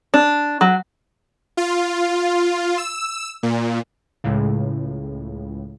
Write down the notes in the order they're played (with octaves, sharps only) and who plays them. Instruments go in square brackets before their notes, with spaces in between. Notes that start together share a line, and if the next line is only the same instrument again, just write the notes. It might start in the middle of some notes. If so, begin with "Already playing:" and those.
[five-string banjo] D4
F#3
[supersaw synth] F4
E6
A#2
[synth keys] C#2 A2 C#3